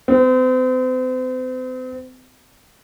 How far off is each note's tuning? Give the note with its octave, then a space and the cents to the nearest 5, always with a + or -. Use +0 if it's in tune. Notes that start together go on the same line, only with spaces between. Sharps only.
C4 -40